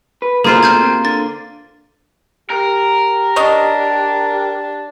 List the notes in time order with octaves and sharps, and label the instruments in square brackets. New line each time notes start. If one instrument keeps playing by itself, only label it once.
[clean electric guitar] B4
[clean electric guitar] D2 B2 A3 [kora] A#3 F4 C5 [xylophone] G#4
[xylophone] F6 G6 G#6
[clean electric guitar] C3
[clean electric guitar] D3 [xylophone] A6
[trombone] G4 [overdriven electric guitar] A#4
[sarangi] D4 [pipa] C#5 D#5